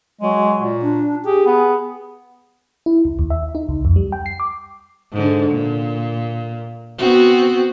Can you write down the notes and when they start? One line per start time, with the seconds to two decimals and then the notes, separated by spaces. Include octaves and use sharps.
0.21 F#3 G#3
0.60 A#2
0.82 D4
1.25 G4 G#4
1.46 B3
2.86 E4
3.05 C#2
3.19 D#2
3.30 E5
3.55 D#4
3.69 C#2
3.85 F2
3.96 G3
4.12 G5
4.26 C7
4.40 D6
5.13 G#2 D3
5.50 A#2
6.98 B3 C4 F#4